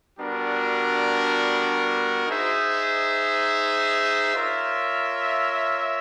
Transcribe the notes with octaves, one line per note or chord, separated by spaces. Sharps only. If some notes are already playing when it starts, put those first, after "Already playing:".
G3 B3 D4 F#4 A#4
D#4 G#4 C5 E5
F4 A#4 C#5 E5